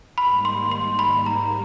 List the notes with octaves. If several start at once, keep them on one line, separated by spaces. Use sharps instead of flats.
G#2 D#3 G3 A#3 B5
C6
C6
B5
A#5